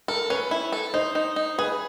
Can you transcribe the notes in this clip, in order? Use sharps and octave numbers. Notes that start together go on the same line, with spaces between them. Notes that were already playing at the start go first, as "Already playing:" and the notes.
A4 A#4
C#4 B4
E4
A4
D#4 C5
D#4
D#4
G#4 B4